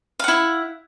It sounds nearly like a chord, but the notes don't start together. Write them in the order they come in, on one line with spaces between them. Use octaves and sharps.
F5 F#5 E4